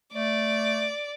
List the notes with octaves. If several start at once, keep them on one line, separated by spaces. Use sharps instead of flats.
A3 D5